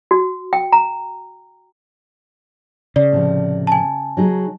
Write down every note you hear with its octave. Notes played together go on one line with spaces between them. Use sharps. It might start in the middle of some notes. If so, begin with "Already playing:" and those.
F#4
G5
A#5
C#3 D5
A2 C3 F3
G#5 A5
F#3 D#4 G#4